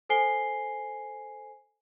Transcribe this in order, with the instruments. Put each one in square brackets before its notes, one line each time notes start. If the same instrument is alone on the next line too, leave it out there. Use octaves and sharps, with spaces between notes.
[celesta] A4 C5 G#5 C7 G7